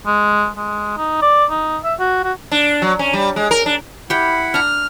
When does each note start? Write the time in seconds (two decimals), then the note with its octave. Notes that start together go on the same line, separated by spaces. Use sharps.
0.06 G#3
0.57 G#3
0.97 D#4
1.22 D5
1.50 D#4
1.84 E5
1.99 F#4
2.24 F#4
2.51 D4
2.82 F#3
2.99 C#4
3.13 G3
3.36 G#3
3.51 A#4
3.66 D4
4.10 E4 G4 F#5 G5 B5
4.54 D4 A#5 F6